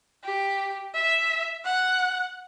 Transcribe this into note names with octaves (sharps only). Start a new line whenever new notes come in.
G4
E5
F#5